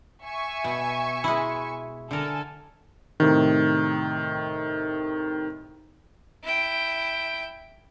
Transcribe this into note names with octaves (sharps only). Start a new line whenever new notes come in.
E5 G#5 C#6
B2
G#3 E4
D3 A4 A#4 G#5
A2 C3 D#3
E4 G5